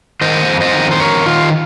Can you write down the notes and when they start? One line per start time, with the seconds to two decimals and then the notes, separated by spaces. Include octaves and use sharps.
0.21 D#3 C5 D#5
0.48 F2
0.61 C5 D#5
0.74 D#3
0.91 C5
1.00 F2 A#4 C#5
1.26 D#3 F4